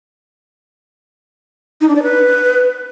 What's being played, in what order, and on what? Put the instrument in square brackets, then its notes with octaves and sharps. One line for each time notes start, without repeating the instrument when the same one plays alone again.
[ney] D#4
D4
D5
B4